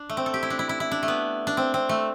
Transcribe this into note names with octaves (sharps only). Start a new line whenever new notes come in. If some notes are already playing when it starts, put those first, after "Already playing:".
Already playing: D4
A3
C4
A4
G4
E4
D4
E4
E4
E4
D4
A3
B3
D4
C4
C4
A3